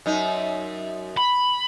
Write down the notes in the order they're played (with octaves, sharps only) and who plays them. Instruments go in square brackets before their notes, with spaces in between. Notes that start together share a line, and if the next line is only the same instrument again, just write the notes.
[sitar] F#2 D#4
[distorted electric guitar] B5